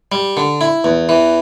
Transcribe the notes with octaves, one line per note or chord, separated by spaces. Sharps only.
G3
D3
E4
E2
E3